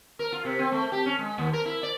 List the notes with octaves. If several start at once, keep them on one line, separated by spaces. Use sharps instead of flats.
A#4
F4
C3
C4
A3
G4
C#4
G#3
D#2
A#4
E4
D5